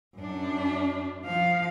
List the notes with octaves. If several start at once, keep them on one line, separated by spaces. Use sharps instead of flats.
F#2 D4
F3 F5